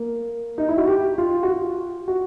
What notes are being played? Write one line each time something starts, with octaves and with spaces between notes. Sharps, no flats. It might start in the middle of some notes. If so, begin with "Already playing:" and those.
Already playing: A#3
D#4
E4
F#4
G4
F4
F#4
F4
F#4